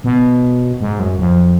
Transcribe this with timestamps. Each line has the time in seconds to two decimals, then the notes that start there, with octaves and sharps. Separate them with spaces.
0.04 B2
0.81 G#2
0.99 F#2
1.19 F2